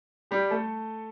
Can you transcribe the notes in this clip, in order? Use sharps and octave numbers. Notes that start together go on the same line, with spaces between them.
G3 G4
A3 A4